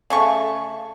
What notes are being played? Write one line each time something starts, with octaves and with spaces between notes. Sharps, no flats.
C#3 A3 C#6